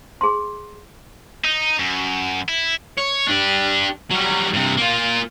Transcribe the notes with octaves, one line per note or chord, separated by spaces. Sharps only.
G#4 C6
D#4
F#2
E4
C#5
D4 G4
F#3 G3
G2 C3
A#3 F4